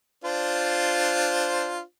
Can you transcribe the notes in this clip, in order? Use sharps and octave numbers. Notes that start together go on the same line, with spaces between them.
D4 F4 C5